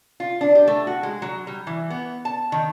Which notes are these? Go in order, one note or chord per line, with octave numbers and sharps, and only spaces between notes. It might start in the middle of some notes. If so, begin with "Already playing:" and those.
F4
D4
G4
A3
F#4
G#3
F#3
G3
E3
B3
A5
D#3